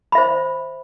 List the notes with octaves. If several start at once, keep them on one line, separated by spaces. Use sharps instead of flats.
C5 E5 B5